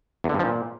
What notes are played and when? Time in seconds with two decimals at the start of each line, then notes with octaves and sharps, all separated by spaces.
0.24 E2
0.29 D3
0.34 G2
0.39 F3
0.45 A#2